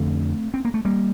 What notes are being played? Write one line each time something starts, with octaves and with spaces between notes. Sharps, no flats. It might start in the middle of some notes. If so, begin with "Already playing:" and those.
Already playing: F2 D3 A3 C4
C4
A#3
A3
G3 A#3